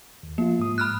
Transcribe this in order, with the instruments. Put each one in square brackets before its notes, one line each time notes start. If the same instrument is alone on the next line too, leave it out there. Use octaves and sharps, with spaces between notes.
[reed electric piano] D#2
[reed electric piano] F3 F4 [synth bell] A#3
[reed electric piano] G#2 D#6
[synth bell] B5 F6 F#6